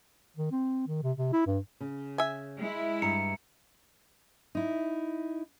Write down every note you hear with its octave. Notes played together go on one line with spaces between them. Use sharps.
D#3
C4
D#3
C3
C3
E4
G2
C#3
E5 G#5
G#3 E4
G2 A#5 C#7
D#4 E4